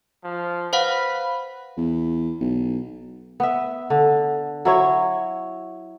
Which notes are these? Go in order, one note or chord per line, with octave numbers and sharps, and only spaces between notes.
F3
B4 C5 F5 F#5
E2
B1
B3 E5
D3
F#3 E4 C#5